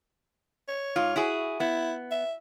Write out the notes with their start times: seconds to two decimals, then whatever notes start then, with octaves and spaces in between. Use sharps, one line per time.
0.68 C#5
0.96 G#2 F4
1.16 E4 F#4 G#4
1.60 B3 E4
2.11 E5